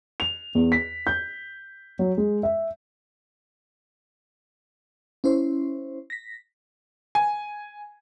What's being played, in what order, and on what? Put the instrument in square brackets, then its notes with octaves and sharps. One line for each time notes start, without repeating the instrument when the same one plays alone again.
[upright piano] F7
E2
B6
G6
F#3
G#3
E5
[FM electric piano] C#4 E4 C5
A#6 B6
[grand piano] G#5